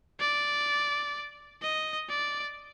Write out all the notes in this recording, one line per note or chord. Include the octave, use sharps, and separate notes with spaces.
D5
D#5
D5